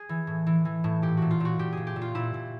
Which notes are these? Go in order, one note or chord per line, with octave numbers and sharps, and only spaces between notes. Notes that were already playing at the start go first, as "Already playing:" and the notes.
Already playing: G#4
E3
A2
E3
E3
A2
A#2 G4
A#2 F#4
F4
A#2 F#4
A#2 G4
A#2 G#4
G4
A#2
F4
A#2 E4
A#2